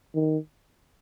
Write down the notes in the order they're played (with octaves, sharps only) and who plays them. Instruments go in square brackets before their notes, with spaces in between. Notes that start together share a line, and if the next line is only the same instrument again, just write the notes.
[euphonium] D#3